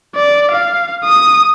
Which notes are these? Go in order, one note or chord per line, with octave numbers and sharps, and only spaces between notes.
D5
F5
D#6